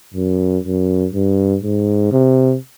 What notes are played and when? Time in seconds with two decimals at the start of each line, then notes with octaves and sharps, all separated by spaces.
0.14 F#2
0.63 F#2
1.13 G2
1.63 G#2
2.12 C3